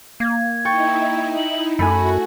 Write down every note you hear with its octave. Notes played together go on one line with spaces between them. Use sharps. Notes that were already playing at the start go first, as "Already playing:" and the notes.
A#3 G#6
D#4 E4 G5 C#6 A6
F#7
F#2 A3 F#4 G#5 B5